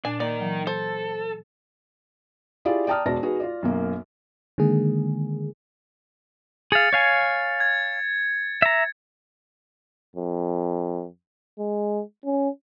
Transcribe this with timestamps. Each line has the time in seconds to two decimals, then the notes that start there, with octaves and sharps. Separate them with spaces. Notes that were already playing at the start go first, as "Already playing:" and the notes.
0.05 A#2 D4 G#5
0.20 A#3 D#4 A#4 D5
0.40 E3 F#3
0.67 A4 C5
2.65 E4 F4 G4 G#4 D5 F5
2.87 D5 G5 A5 A#5 D#6 F6
3.06 E1 F#4 C5 D5 A5 A#6
3.22 D#4 F#4 G#4 B4
3.40 F4 D5
3.62 B1 F#2 A#3
4.58 D3 D#3 G#3 A#3 G#4
6.72 G#4 F5 A6 C#7
6.93 C#5 F5 G#5
7.60 G#6
8.62 E5 A#5
10.16 F2
11.59 G#3
12.25 C#4